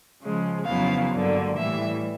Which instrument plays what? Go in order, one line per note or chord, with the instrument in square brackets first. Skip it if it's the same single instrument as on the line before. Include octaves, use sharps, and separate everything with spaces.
[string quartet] C#3 F3 G#3
F2 C#3 F#3 B3 E4 F5
G2 D3 F#3 A#3
A2 E3 G3 E5